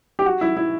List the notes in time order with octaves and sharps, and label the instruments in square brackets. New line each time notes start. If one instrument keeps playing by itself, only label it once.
[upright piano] G4
F#4
E4
E4